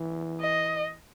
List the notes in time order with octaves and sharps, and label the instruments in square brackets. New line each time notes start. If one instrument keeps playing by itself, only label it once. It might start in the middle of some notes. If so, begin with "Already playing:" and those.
Already playing: [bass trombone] E3
[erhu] D#5